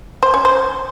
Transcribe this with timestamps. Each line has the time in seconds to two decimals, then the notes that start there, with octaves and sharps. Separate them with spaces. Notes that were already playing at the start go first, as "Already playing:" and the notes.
0.23 C5
0.34 C#4
0.45 C5